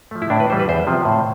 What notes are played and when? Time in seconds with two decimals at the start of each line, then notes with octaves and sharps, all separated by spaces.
0.11 F3 A3
0.22 E4
0.30 A2 D4
0.40 B4
0.50 E3 C5
0.53 G3
0.59 B4
0.68 E2 C5
0.87 C3 F3
1.05 A2